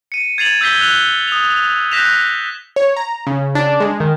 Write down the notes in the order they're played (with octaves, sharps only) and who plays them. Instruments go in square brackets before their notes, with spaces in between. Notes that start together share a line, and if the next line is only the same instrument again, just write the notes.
[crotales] C#7 D#7
G#6 A6 C7 D#7 F7 F#7
E6 G6 G#6 B6 C7 G7
E6 F#6 F7 G7
D#6 F7
F#6 G6 A#6 B6 E7 F7
[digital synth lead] C#5
A#5
C#3
[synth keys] D4
[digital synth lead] G#3
[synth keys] D#3